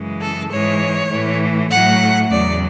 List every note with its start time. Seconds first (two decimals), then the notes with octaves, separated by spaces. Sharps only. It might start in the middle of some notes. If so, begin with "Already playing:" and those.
Already playing: F#2 C#3 E3 G#3
0.21 A4
0.51 G#2 E3 G#3 C#5
1.10 A2 E3 A3
1.71 A2 F#3 A3 F#5
2.31 E2 C#3 F#3 D5